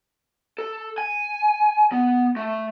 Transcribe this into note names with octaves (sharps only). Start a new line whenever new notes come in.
A4
G#5
B3
A3